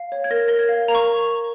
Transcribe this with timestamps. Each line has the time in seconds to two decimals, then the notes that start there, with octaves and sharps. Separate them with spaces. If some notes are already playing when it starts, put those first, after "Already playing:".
Already playing: F5
0.12 C#5
0.24 G#6
0.31 A#4 A#6
0.48 A#4 A#6
0.59 G#6
0.69 F5
0.88 A#4 A#5
0.95 C#6